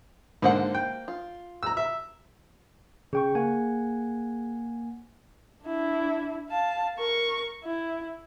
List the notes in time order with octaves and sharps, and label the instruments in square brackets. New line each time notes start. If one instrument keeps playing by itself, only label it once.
[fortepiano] G#2 D3 [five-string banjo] A#3 C5 F#5
[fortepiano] G5
[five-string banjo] F4
[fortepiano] A#5 E6
E5
[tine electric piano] C#3 G5 C#6 [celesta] G#4
[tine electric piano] A#3 F#5 G#5
[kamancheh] D4 E4
F5 A5
A#4 C#6
E4